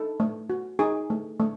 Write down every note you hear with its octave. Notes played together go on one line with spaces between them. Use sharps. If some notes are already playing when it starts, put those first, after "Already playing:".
Already playing: D#4 A4
A3
F#4
D#4 G#4
A3
A3